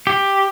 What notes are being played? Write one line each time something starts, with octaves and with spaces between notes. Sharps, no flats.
G4